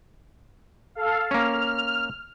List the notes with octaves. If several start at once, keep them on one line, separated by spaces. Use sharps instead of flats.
A4 F5
A#3 C#4 F6